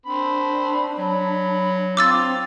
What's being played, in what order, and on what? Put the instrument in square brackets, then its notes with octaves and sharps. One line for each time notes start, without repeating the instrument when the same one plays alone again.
[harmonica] C4 B5 [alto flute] D4
[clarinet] F#3 [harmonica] B5
[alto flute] C4 [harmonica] F4 C6 [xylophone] D6 E6 A6